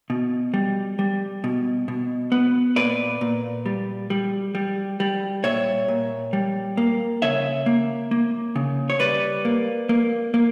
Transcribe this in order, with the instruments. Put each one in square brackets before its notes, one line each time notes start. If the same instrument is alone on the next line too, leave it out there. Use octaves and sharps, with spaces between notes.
[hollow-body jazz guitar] B2
G3
G3
B2
B2
B3
A#2 B4 D5
A#2
G3
G3
G3
G3
A#2 C#5 E5
A#2
G3
A#3
C#3 C#5 E5
A#3
A#3
C#3
C#5
G3 B4 D5
A#3
A#3
A#3